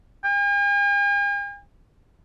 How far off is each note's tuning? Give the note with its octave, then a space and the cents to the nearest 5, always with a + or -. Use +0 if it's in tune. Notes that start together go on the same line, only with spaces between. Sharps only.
G#5 -45